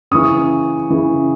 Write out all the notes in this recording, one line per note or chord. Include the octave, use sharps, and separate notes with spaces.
C#3 E3 C#6 D#6
C#3 E3